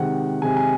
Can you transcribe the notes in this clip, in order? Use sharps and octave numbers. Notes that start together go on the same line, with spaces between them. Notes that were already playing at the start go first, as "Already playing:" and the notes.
Already playing: C3 D#3 G#3 F#5
C3 D#3 G#3 G#5
G#5